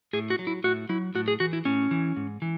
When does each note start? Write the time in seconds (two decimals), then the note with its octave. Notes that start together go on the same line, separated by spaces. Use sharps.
0.13 A2 G#4
0.30 F#4
0.39 F#3
0.47 E4
0.64 A2 F#4
0.89 F#3 E4
1.15 A2 F#4
1.28 G#4
1.40 E3 F#4
1.53 E4
1.65 A2 C#4
1.91 E3
2.16 G#2
2.42 E3